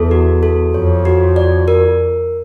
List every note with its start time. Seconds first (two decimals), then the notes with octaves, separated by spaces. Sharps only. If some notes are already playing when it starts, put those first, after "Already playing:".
Already playing: E2 A4
0.11 F#4
0.43 A4
0.74 F2 C#5
1.05 F#4
1.36 D5
1.68 A#4